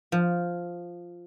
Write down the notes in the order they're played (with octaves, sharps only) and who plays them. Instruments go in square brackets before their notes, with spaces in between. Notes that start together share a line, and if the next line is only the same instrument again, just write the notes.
[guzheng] F3